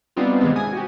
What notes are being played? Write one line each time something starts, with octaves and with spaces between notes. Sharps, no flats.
G3 B3 C4 D4 D#4 F4
C3 D#3 E3 G#3 B3 C4
G#5 D#6
F#4 G4